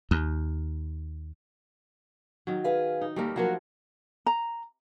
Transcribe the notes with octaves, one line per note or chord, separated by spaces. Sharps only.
D#2
D#3 F#3
G#4 B4 F5
D#4
D#2 G3 A3 A#3 A#4
F3 F#3 A#3 F#4 A#4
A#5